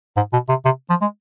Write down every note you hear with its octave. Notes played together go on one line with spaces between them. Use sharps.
G#2
B2
C3
C3
F3
G#3